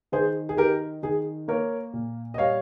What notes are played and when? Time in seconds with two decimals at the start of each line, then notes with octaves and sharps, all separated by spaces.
0.12 D#3 G#4 C5
0.49 G#4
0.57 D#4 G4 A#4
1.03 D#3 G#4
1.48 A#3 A#4 C#5
1.93 A#2
2.34 D#5
2.38 G3 C#5 F5